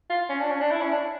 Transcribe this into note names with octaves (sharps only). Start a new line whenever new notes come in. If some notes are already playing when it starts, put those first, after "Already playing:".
F4
C#4
D4
C#4
D4
E4
C#4
D4